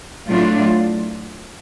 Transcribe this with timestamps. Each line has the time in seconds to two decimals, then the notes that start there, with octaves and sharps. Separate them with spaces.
0.27 A2 F#3 A3 D4 F4